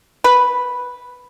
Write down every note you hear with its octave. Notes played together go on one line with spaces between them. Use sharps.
B4